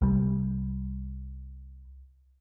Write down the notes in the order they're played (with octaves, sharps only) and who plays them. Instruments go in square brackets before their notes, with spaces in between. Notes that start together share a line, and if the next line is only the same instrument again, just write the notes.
[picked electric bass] C2 G3